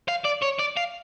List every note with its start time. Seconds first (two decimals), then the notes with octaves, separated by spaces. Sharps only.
0.08 F5
0.24 D5
0.42 C#5
0.59 D5
0.77 F5